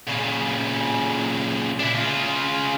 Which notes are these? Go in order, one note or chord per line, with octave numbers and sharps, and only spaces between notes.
A#2 C#3
D4 E4
C#3 F4